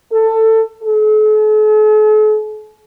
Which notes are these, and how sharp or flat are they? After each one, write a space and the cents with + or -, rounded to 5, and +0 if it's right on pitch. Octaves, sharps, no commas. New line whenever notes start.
A4 +20
A4 -45